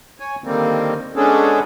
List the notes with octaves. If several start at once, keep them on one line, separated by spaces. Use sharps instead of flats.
C#5 G#5
D3 D#3 G3 A#3 C4
G#3 B3 C#4 D4 G#4 A4